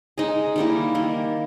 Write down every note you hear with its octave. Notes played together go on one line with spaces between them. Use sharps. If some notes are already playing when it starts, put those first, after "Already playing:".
G#3 D#4 G#4
D#3 G3 A#3 E4
D#3 G3 A#3 E4